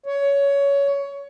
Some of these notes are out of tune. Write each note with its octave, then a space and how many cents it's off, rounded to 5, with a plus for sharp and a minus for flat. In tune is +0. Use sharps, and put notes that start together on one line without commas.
C#5 +20